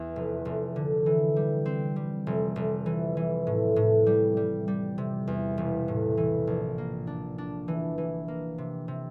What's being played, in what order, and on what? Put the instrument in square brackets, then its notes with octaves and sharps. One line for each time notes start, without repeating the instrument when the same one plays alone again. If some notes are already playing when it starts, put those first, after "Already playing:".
Already playing: [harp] E2
F1
F1
D3
E3
G3
C4
G3
F1
F1
E3
E3
A2
A2
G3
G3
G3
C3
E2
E1
A2
E3
A#1
A#3
D4
D4
E3
E3
A#3
C3
C3